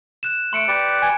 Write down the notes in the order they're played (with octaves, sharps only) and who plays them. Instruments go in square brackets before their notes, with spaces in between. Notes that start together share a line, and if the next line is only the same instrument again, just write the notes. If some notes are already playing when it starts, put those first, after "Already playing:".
[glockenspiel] F#6 E7
[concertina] A3 [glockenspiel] C6 C#7 D7
[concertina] G4 B4 D5
[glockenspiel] G#5 G#6